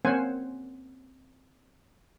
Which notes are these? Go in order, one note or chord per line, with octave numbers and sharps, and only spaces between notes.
A#3 C4 C#4 C5 F#5 G#5